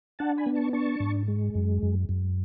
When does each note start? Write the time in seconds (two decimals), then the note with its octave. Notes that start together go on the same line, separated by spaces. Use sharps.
0.19 D4 F#5 A5
0.38 G#5 B5
0.46 B3
0.55 A5 C#6
0.73 D4 A5 C#6
1.00 G#2
1.28 G#3
1.55 F#2
1.83 F#2
2.09 F#2